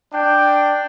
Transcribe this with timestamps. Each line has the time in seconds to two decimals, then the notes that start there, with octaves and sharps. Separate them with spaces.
0.13 D4 G5